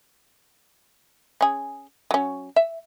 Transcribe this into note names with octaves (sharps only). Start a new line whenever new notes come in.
C#4 G#4
F#3 C#4
E5